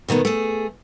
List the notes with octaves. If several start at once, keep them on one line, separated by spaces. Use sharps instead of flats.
B2 D#3 A3 B3
A3 G#4